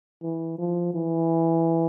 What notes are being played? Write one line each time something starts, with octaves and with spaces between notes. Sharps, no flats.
E3
F3
E3